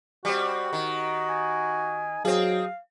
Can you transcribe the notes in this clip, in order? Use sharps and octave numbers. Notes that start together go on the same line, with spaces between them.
G3 C4 F#4
D#3
G#5
F#3 C4 G#4 F5